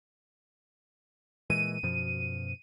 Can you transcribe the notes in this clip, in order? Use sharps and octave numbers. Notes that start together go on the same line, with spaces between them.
A#2 E3 G#3 D#7
F#2 B2 F3